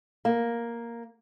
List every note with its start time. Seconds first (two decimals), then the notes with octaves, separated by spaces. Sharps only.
0.25 A#3